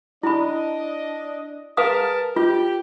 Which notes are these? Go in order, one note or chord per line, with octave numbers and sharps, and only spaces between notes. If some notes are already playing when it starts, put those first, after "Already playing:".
D4 E4 D#5 B5
G#4 A#4 B4 F5 A5 D#6
F4 G4